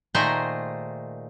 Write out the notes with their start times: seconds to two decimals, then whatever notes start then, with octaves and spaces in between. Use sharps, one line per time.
0.15 A#2 D#3 A3 G#4 C5 A#5